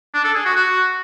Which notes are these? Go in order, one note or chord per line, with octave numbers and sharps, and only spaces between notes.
D4
A4
G#4
F#4
F#4